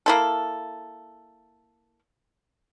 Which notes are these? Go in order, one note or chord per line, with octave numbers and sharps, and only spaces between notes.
A#3 E4 A4